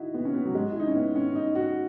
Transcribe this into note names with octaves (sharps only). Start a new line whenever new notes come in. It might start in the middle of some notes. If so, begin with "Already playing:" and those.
Already playing: D#4 E4 F#4
B3
C#4
B3
F#3
G#3
E4
D#4
C#4
B3
C#4
D#4
F#4